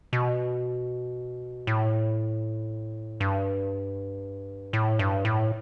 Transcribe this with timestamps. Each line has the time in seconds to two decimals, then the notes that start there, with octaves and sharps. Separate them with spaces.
0.13 B2
1.67 A2
3.20 G2
4.73 A2
4.99 G2
5.25 A2